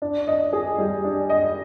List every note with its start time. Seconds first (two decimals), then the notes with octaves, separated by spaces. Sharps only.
0.02 D4
0.27 D#5
0.53 G#4
0.78 G3
1.04 D4
1.29 D#5